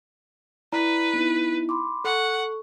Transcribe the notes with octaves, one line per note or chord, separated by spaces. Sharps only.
E4 B4 D5 A#5
B3 D#4 E4
B5 C6 D6
A4 F#5 C#6